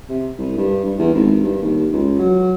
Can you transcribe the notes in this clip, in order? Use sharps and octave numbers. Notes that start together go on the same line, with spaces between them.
C3
C2
G2
G2
E2
G#1
G2
D#2
C#2
F#3